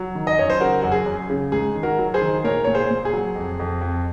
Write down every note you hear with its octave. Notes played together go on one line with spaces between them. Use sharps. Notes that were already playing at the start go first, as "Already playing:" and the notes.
Already playing: F#3
D#3
D#5
F#2 C#5
C5
C#3 F#4 A#4
F#2 F#4
G#4
F#2
C#3
G#2 G#4
D#3
F#4 A#4
F#3
G#4 C5
D#3
A#2 A#4 C#5
A#2 C#5
G#4 C5
A#2
G#4
F#3
F2
F2
F2